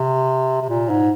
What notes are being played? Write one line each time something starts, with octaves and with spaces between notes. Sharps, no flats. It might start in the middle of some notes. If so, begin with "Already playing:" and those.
Already playing: C3
C3
A#2
G#2